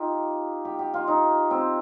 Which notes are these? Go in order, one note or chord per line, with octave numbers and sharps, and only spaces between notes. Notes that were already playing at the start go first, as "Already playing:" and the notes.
Already playing: D#4 F4 G4
G4
G4
F4
D#4
C4